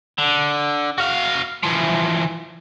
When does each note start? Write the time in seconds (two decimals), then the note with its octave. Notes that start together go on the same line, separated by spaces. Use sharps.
0.18 D3
0.98 F#4 F5
1.63 E3 F3